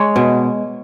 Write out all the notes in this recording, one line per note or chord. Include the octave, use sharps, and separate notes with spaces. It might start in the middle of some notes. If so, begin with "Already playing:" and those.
Already playing: G#3 C#5
B2